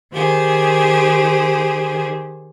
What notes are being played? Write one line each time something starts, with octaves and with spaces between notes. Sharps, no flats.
D#3 G4 G#4 C5